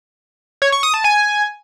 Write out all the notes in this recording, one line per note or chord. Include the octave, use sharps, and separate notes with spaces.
C#5
C#6
D#6
A5
G#5